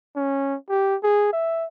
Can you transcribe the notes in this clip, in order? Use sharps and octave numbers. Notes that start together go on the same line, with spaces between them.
C#4
G4
G#4
E5